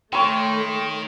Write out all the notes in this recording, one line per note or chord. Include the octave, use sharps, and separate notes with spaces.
D#3 A3 C#5 G5 B5 C6